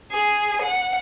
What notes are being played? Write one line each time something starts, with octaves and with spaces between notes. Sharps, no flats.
G#4
F#5